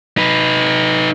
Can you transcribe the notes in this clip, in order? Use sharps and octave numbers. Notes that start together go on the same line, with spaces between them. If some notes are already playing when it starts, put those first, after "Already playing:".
D#4 B4